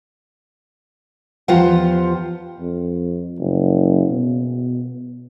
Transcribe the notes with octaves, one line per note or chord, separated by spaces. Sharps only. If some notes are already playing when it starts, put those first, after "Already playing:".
E2 F3 F4 G4 C5 F#5
F2
F#1
B2